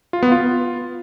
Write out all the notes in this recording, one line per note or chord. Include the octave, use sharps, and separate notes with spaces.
F4
B3
F4